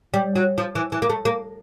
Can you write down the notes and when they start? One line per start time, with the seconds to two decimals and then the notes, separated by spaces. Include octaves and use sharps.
0.14 G3
0.36 F#3
0.58 F3
0.75 E3
0.92 E3
1.02 A#3
1.10 A3
1.25 A#3